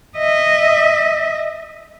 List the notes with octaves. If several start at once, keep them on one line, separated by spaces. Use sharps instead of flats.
D#5 E5